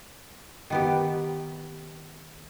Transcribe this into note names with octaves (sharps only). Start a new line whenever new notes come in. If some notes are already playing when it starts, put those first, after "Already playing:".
D#3 B3 G4